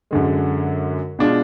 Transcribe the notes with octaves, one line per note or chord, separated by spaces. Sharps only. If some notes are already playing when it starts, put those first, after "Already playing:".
F#2 D3 G#3
B2 G#3 D4 F4